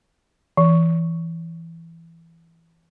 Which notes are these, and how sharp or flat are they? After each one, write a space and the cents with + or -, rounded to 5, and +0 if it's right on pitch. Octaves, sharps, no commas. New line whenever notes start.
E3 +10